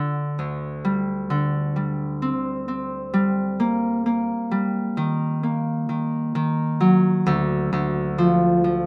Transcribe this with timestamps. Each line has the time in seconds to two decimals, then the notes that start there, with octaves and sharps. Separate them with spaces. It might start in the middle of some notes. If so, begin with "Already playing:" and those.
Already playing: D3
0.39 D2
0.85 G3
1.30 D3
1.76 G3
2.22 C4
2.68 C4
3.14 G3
3.60 A#3
4.06 A#3
4.51 G3
4.97 D#3
5.43 A#3
5.89 D#3
6.35 D#3
6.81 F#3
7.26 D2
7.73 D2
8.18 F3
8.64 F3